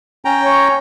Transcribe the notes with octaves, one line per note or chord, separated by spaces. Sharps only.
C#4 G5 A#5
C#5